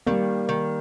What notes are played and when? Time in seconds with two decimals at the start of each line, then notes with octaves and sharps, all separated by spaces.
0.06 D#3 G3 A#3
0.49 D#3